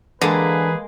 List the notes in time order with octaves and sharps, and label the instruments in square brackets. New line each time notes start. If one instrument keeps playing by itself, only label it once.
[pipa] D3 [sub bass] E3 [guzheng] G#3 A#3 [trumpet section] G#4 B4